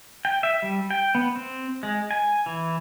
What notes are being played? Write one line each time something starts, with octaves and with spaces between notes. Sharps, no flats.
G5
E5
G3
G5
B3
C4
G#3
G#5
E3